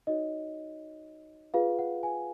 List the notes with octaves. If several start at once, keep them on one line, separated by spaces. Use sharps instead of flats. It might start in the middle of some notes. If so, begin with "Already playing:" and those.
D#4 F#4 C#5 D#5
F4 G#4 B4 F5
F#5
G#5